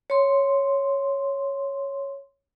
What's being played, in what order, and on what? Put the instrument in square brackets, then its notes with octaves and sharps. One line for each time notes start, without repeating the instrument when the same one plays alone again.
[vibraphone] C#5 C6